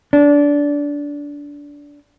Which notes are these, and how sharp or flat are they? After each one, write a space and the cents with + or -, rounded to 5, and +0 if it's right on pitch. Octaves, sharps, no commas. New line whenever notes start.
D4 -20